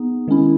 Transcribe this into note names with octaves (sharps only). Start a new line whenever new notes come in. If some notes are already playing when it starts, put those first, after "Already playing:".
Already playing: B3 D#4 G#4
D#3 G#3 C#4 E4